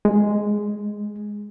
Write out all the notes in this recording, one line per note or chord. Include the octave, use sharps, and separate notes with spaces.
G#3